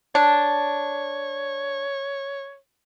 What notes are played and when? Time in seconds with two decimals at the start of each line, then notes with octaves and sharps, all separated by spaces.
0.15 D4 C#5